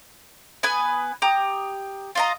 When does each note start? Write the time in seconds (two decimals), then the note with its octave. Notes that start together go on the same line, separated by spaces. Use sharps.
0.63 B3 B4 G#5
1.22 G4 A#5 D#6
2.15 F4 D#5 A#5